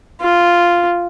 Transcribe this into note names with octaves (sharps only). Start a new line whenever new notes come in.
F4